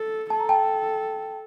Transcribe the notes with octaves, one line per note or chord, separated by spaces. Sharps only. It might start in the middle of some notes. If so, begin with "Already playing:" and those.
Already playing: A4
A4 A5
A#5
G5 A5